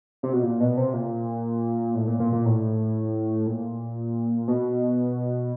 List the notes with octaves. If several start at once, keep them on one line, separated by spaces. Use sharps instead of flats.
C3
B2
A#2
B2
C3
A#2
A2
A#2
A#2
A#2
A2
A#2
B2